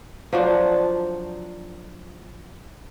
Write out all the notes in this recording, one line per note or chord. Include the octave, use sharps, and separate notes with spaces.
F3 F#3 D4